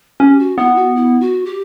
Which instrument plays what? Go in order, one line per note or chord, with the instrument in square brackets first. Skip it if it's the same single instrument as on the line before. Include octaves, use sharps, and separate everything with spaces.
[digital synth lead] C#4 [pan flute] G4
[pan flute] F#4
[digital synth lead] B3 [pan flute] E4
[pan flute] F#4
E4
F#4
G4